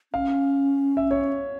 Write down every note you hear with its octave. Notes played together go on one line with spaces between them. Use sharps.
C#4 F5
E5
C#5